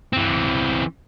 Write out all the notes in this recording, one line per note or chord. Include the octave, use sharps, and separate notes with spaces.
E3 C4